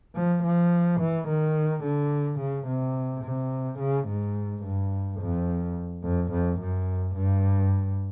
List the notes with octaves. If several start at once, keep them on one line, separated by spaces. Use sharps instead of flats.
F3
F3
E3
D#3
D3
C#3
C3
C3
C#3
G#2
G2
F2
F2
F2
F#2
G2